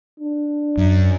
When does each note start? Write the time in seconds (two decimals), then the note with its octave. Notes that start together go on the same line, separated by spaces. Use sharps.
0.20 D4
0.77 F#2